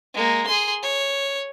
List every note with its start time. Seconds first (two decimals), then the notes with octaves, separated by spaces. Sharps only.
0.14 G#3 A#3
0.47 G#4 C6
0.83 C#5